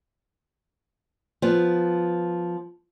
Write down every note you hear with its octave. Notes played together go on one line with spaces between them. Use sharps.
F3 B3